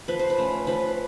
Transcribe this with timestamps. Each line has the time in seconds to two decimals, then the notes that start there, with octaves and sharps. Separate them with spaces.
0.08 F3 B4
0.19 C5
0.30 B4
0.38 A3 C#4
0.67 F3 B4